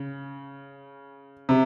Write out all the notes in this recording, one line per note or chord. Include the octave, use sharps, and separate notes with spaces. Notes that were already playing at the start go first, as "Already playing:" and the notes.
Already playing: C#3
C3